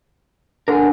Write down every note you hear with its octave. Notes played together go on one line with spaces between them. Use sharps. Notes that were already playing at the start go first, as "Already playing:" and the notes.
D3 D4 A#4 G#5